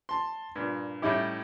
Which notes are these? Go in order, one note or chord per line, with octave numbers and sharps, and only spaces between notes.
A5 C6
G2 A#2
A2 G3 C#4 D#4 E4 G4